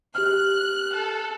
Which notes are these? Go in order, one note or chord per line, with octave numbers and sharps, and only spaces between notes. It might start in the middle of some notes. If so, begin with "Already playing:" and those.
G4 F6 F#6
A4